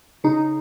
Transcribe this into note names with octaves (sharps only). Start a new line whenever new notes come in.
C#3 D#4